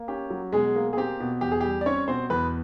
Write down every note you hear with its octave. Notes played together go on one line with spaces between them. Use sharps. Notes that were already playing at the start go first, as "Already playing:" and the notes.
Already playing: A#3
C#4 G4
F#3
B2 G#3 G#4
A#3
G#4
C4 G4
B2
E2 G4
G#4
G3 G4
D5
C4 C#4 C#5
B2 C4 C5
E2 B3 B4